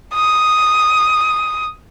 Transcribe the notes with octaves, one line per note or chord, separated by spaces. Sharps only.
D#6